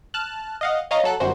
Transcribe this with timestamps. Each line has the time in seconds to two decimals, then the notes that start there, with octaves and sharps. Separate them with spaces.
0.14 A5 F6 F#6
0.61 D#5 F5 F#5
0.91 C#5 D#5 F5 A#5
1.04 F#3 A4 F#6
1.20 G1 F#2 F#4 C5